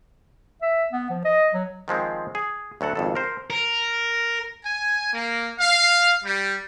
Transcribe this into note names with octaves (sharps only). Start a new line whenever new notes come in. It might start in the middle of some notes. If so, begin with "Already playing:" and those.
E5
B3
F3
D#5
F#3
D#3 F3 G#3 C4
G#4
D2 F#3 A4 F#5
G#1 F2 A4
A#4 C5
A#4
G#5
A#3
F5
G3